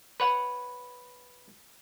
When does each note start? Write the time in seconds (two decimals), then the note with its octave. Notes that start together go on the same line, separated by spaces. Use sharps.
0.20 B4 C#5 F#5